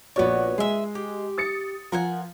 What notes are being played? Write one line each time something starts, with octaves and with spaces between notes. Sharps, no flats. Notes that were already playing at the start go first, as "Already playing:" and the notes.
A#1 B3 F#4 C#5 D5
G#3 G#4 E5
G4
D#6 A6 C#7
F3 A#4 F#5 G#5